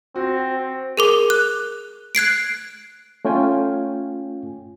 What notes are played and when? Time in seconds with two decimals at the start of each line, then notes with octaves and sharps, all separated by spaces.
0.16 C4 F#4
0.97 G#4 A#4 D6
1.30 F#6
2.15 F#6 G#6 C7 D7
3.25 A3 C#4 F4 G5 G#5